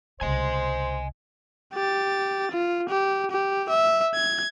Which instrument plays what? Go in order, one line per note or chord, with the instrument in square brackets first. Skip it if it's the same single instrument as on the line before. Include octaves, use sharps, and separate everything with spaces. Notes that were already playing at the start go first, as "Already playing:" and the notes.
[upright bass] C2 C#3 [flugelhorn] C5 [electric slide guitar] D#5 G#5
[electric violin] G4 A6
F4
G4
G4
E5
G#6